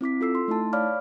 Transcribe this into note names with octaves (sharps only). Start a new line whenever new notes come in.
C4 E4 D6 B6
F4 A4 E6 C7
C6
A3 D#4 E4 A5
C#5 D5 F5 B5 D6 F6